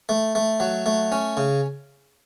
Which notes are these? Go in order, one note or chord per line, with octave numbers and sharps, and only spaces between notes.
A3
A3
F#3
A3
C#4
C#3